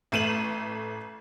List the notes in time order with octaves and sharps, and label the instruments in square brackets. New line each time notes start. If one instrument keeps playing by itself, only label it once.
[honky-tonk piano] A1 A3 D#7 E7 F#7